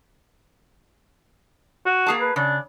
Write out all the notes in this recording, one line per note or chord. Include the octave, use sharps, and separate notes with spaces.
F#4
A#3 G#4 A5
B4
C#3 D4